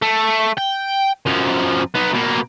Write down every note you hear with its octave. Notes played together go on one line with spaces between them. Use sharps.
A3
G5
F#2 F3
B3 D#4
B2 A#3